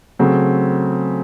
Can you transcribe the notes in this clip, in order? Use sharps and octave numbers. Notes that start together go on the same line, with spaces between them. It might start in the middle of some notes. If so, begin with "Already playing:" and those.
C#3 F#3 A3 C4